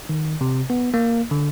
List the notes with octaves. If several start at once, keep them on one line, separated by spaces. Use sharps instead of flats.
D#3
C3
B3
A#3
D3